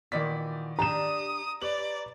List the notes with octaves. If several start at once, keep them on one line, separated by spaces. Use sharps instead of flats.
A#2 D#3 E3 F#4 D5 B6
D4 G4 A#5 D#6 E7
G4 B4 C#5 D5 F#7